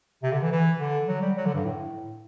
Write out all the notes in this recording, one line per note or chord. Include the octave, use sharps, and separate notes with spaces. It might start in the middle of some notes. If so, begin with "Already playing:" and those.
C3
D3
E3
E3
D3
F#3
G3
F#3
D3
G2
A2